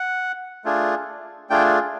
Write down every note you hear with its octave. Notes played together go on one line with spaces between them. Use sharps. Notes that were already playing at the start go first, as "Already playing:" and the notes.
Already playing: F#5
A3 D4 F4 G#4
A3 D4 F4 G#4 G5